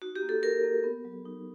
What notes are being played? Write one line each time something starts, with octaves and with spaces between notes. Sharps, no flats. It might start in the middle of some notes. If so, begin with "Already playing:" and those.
D#4 F#4
G4
A#3
A4
F#4 A#4
A#3
B3
F#3
D#4